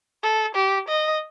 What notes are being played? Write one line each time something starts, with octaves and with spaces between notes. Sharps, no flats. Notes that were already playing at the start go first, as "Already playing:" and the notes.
A4
G4
D#5